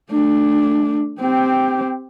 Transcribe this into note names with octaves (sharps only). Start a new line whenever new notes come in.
A3 D4
C4 G4